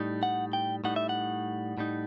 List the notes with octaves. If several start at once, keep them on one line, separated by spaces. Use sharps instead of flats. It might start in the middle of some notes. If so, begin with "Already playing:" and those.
Already playing: A2 G3 D#4
F#5
G5
A2 G3 D#4 F#5
E5
F#5
A2 G3 D#4